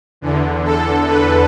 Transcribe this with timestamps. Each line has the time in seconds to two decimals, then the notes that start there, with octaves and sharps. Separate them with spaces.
0.21 E2 D3
0.65 A4
1.07 B4